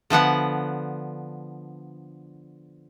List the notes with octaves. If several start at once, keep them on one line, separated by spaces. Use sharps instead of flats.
D3 F3 B3 F#5